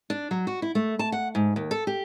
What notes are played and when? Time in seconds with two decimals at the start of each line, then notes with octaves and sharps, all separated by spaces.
0.10 D4
0.31 F#3
0.47 F#4
0.62 E4
0.75 A3
0.99 A5
1.12 F#5
1.35 G#2
1.56 D#2
1.71 A4
1.87 G4